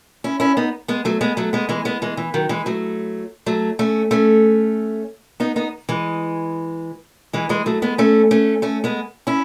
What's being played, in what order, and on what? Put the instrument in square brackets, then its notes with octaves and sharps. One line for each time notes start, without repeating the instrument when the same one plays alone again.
[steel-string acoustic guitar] C#4 E4
C#4 E4
B3 D#4
G#3 B3
F#3 A3
G#3 B3
F#3 A3
G#3 B3
E3 G#3
G#3 B3
E3 G#3
E3
D#3 F#3
E3 G#3
F#3 A3
F#3 A3
A3 C#4
A3 C#4
B3 D#4
B3 D#4
E3 G#3
E3 G#3
E3 G#3
F#3 A3
G#3 B3
A3 C#4
A3 C#4
A3 C#4
G#3 B3
C#4 E4